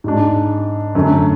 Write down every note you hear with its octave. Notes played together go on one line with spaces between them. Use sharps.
G#2 G#3 D4
F#2 D3 A3